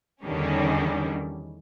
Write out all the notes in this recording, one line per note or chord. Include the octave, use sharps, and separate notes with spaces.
E2 D3 D#3 G3 C#4